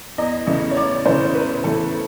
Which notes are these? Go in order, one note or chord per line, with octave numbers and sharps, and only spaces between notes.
E2 D#5
C#3 E3 A3 D#5
C#5
E2 D5
C#3 E3 A3 C5
E2 B4
C#3 E3 A3 A4